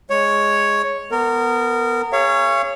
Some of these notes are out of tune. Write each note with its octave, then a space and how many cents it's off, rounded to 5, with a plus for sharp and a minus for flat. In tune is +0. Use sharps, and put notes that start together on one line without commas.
G#3 +0 C#5 +0
B3 +0 A#4 -25
G#4 -35 C#5 +0 F5 -40